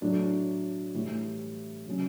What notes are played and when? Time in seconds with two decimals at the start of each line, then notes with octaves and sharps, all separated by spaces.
0.01 A2 F#3 A3 D4 A4
0.94 A2 E3 G3
1.87 C#3 F#3 C#4